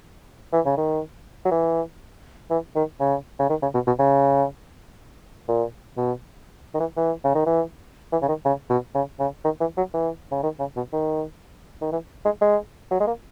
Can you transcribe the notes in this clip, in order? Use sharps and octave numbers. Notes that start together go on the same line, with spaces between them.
E3
C#3
D#3
F#3
E3
E3
D#3
C#3
C#3
D#3
C#3
B2
B2
C#3
A#2
B2
D#3
E3
E3
C#3
D#3
E3
E3
C#3
D#3
C#3
B2
C#3
C#3
D#3
E3
F#3
E3
C#3
D#3
C#3
B2
D#3
D#3
E3
G#3
G#3
F#3
G#3
A#3